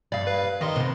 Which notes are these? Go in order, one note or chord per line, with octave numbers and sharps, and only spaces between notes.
G2 G3 D5 F5
B4 F5
D#3 D#4 D#5 C6
C3 B3